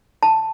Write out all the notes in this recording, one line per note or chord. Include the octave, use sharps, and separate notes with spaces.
A5